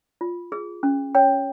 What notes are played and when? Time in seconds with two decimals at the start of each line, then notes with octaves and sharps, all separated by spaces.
0.21 F4
0.52 G#4
0.83 C#4
1.15 C#5 G5